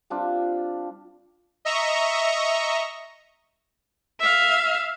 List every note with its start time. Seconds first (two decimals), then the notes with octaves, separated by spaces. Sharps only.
0.10 G3 C4 D4 F4
1.65 D#5 E5 A#5 C#6
4.20 E5 F5